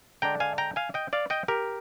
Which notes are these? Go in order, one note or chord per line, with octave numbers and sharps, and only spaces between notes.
D3 G#3 D4 G5 A#5
F5 G#5
G5 A#5
F5 G#5
D#5 G5
D5 F5
D#5 G5
G4 A#4